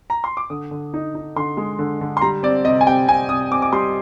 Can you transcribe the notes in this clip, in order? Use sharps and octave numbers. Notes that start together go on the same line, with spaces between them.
A#5
C6
D6
D3 D#6
D3
D#4
D#4
D3 C6
G#3
D3
D3
C6
G3 A#5
C4 D5
C3 D#5
G#5
C3 G5
C3 G#5
C3 D#6
C4 D6
D6
G3 C6